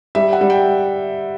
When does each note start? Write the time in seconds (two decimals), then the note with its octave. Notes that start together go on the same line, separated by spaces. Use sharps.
0.15 G3 E5
0.33 F#5
0.41 G3
0.50 G5